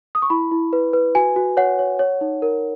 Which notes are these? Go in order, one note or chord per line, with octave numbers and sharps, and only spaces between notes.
D#6
C#6
E4 B5
E4
B4
B4
F#4 G#5
F#4
C#5 F#5
C#5
C#5
D#4
A#4